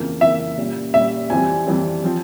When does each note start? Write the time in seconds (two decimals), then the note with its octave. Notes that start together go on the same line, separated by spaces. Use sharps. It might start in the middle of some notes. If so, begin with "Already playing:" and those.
Already playing: F2 C#3 E3 A#3
0.21 F2 C#3 E3 A#3 E5
0.57 A#2 G3 C#4
0.94 A#2 G3 C#4 E5
1.30 F2 E3 G3 C4 G#5
1.66 F2 E3 G3 C4
2.04 F3 C4